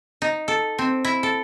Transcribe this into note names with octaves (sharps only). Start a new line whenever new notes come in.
D#4
A4
C4
E4
A4